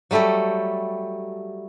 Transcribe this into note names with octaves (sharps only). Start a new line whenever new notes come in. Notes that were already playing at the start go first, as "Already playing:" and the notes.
F#3 G3 A3 G4 A4